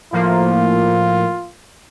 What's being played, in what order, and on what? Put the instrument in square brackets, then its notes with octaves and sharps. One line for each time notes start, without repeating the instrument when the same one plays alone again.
[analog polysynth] A2 F3 A#3 [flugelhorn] F4